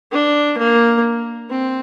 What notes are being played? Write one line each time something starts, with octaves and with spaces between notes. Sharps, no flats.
D4
A#3
C4